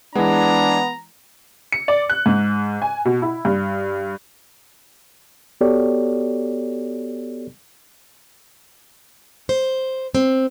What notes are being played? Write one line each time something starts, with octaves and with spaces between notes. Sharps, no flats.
E3 G#3 B3 D4 A#5
C#7
D5
F#6
G#2
G#5
B2
E4
G2
B3 F#4 G4 A4 C#5 D5
C5
C4